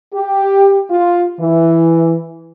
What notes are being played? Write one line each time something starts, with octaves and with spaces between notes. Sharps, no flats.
G4
F4
E3